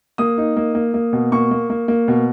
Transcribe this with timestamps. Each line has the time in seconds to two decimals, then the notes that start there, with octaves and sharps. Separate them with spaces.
0.18 A#3 D#6
0.38 D#4
0.57 A#3
0.75 A#3
0.94 A#3
1.13 B2
1.32 A#3 C#6
1.51 A#3
1.70 A#3
1.88 A#3
2.08 B2